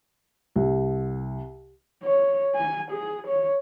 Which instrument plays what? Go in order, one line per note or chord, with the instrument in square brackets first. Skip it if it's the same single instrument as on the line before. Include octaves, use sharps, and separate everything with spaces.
[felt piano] C2
[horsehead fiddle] C#5
G#5
G#4
C#5